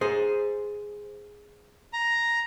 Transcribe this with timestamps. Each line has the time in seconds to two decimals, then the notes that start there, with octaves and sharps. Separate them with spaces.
0.01 G#4 C5
1.93 A#5